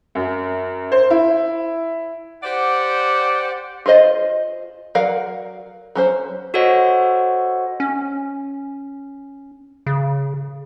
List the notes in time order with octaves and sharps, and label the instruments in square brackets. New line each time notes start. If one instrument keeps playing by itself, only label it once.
[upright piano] F#2
C5
E4
[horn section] G4 C5 D5 F#5
[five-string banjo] F4 G#4 C5 D#5
F#3 A#4 D5 F5 F#5
F#3 C#4 C5
[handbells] F#4 A4 C5 C#5 D#5 F#5
[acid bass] C#4
C#3